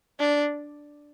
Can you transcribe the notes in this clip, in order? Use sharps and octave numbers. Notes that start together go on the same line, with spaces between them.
D4